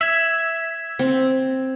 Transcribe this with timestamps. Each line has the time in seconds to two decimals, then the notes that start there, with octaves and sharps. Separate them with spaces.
0.01 E5 G#6 E7 F#7
0.99 C4